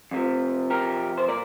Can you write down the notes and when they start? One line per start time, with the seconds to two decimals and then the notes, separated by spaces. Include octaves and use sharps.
0.11 F2 C3 F3
0.70 G4 A#4
1.18 C5
1.28 A#2 A#4 D5